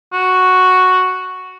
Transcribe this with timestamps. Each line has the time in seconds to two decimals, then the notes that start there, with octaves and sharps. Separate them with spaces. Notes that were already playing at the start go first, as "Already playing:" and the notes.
0.13 F#4